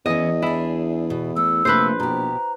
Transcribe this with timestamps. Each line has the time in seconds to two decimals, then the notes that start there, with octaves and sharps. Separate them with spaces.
0.06 E2 E3 B3 C#4 D#5
0.42 D4 E4 G#4
1.10 B2
1.36 A3 E6
1.65 A#1 C3 A3 A#3 B4 C5
2.00 B2 G4 A#5